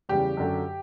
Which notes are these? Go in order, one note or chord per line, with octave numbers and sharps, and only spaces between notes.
E2 C#3 G3 G4
F#2 D3 F#3